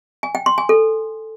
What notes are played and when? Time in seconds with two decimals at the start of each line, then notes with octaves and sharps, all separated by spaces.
0.23 G#5
0.35 G5
0.46 C6
0.58 G#5
0.69 A4